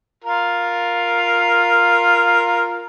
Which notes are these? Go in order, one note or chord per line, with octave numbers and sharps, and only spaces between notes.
F4 A#4